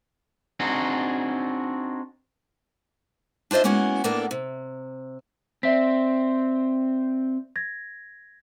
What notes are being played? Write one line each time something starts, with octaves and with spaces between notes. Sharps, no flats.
C4 D4 D#4 F#4 G#4
D4 F4 C5 D#5 E5
G#3 A#3 B3 C#4 E4 F#4
A2 A#3 B3 D4 A4
C3
C4 D5 E5 B6
G#6 A#6